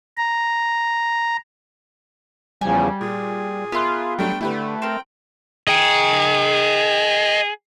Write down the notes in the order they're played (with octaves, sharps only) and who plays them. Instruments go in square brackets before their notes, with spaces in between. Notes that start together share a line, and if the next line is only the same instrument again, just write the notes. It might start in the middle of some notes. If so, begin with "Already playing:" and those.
[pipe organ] A#5
[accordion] E2 C#3 F3 [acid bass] G3 [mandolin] G#5
[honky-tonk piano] A#2 [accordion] G#4
[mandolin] B3 C6 [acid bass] F4 [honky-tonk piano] A#4 E5 F#6
[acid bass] F#3 [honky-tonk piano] G3 A3 D4 [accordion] G5
[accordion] D3 [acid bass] A3 [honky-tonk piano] E4 G4 B4
[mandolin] C4 A#4 [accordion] G5
[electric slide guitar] G#4 [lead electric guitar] D#5 G5